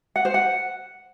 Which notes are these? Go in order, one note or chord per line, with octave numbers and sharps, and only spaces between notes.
F#5
C5
F#5